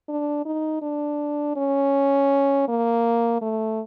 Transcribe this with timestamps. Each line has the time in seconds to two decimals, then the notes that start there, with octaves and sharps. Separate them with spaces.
0.09 D4
0.45 D#4
0.82 D4
1.56 C#4
2.68 A#3
3.42 A3